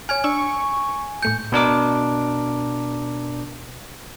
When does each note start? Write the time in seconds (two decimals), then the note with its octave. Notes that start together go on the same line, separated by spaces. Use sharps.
0.09 C#5 G#5 F6 G#6
0.24 D4 C#6 E6
1.22 A2 A3 G6 C#7
1.52 B2 D4 A#4 D6